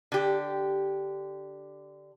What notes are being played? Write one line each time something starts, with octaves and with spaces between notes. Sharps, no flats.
D3 G4